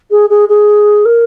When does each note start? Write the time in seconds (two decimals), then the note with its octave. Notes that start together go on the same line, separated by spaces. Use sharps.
0.10 G#4
0.29 G#4
0.48 G#4
1.05 A#4